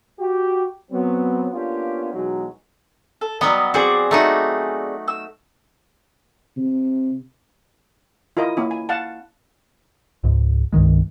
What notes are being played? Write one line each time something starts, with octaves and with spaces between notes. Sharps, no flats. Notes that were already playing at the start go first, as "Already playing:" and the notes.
F#4 G4
F#3 B3 C4
A#3 B3 C#4 D4 F4 G4
E2 B2 F#3 G#3 D#4
A4
F#3 G3 B3 D#5 A#5
C4 F#4 G#4 D5
A3 D#4 F#4
E6
C3
E4 F4 A#4 D#5
A#3 C#4 E4
G#5
F5 F#5 A5
C#2 G#2
C2 G2 D#3 G#3